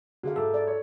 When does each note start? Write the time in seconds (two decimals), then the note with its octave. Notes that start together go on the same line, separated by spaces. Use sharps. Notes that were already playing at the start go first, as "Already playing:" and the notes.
0.23 D3 F#4 G#4 F5
0.36 G#2 A4 E5 D6
0.54 D5
0.67 C#5